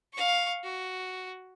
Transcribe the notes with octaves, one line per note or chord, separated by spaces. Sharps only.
F5 C#6
F#4